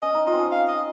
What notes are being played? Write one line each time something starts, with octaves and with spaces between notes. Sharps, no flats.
C#4 D#5
D#4
F4 D#5
C4
C#4
F5
D#5